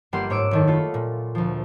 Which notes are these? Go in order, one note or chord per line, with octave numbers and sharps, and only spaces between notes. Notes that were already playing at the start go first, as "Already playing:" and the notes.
G1 G3 A#3 G4 F#5 C6
G#2 C#5 D6 E6 D7
F#1 D#3 A4
A3 F4 B5
A#2
D2 F3